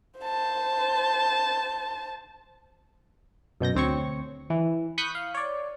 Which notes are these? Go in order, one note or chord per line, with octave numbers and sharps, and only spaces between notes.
C5 A5
F#2 B2 G6 A#6
D2 C4 C#5 C#6
E3
B5 C#6 D#6 F#6 G6 B6
F5
C#5 D5